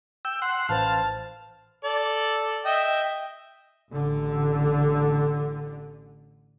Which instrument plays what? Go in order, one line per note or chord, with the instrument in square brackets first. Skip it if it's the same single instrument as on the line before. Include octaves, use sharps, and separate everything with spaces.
[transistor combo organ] G5 E6
F#5 C6
[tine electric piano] A1 B4 C5 [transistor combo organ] F5 [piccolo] A5
[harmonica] A4 D5
D#5 E5 G5
[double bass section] A1 D3